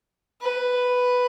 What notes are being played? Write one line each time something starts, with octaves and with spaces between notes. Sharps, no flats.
B4